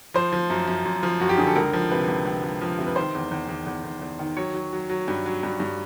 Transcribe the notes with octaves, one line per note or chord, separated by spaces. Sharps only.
F3 C5
F3
F#2
F#2
F#2
F3
F#2 F#4
G4
D3 G#4
A4
C#2 A#4
F3
C3 B4
C#2
C#2
C#2
F3
C3
B4
D#3 C5
E2
E2
E2
E2
E2
E2
D#3
F#3 C#5
F#3
F#3
F#3
G2
F#3
G2
G2